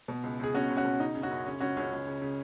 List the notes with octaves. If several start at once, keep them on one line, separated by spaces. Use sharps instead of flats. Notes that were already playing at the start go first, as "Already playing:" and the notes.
B2
C#2
C#2 G#4
B2 C#4 F#4
C#2
C#4 F#4
B2
C#3 D#4
C#3
C#4 F#4
F#2
C#3 C#4
C#2 C#4 F#4
C#2 C#4
C#2
C#3
C#3